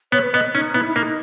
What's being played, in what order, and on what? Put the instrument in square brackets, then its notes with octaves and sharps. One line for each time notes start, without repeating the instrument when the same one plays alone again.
[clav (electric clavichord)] B3 [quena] C#5
[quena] B4
[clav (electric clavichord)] B3 [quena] D#5
[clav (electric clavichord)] C#4 [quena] D#4
[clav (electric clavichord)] B3 [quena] E4
[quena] E4
[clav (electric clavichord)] A#3 [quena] D#4